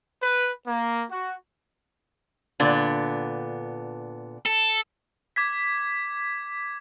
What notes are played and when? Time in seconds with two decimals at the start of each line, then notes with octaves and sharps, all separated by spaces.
0.21 B4
0.67 A#3
1.10 F#4
2.60 A#2 D3 B3
4.46 A4
5.36 D6 G#6 B6